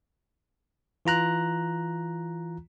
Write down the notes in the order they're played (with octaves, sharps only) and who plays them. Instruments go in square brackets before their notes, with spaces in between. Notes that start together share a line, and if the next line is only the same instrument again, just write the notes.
[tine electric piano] E3 F4 A#5 F#6